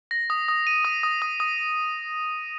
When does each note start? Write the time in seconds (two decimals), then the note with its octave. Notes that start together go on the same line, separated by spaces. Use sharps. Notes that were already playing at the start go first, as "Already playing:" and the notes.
0.11 A#6
0.30 D#6
0.48 D#6
0.67 D#7
0.85 D#6
1.03 D#6
1.22 D#6
1.40 D#6